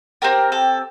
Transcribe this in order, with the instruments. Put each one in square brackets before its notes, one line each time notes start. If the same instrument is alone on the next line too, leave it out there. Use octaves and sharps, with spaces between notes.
[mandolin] C4 G4 A#4
A4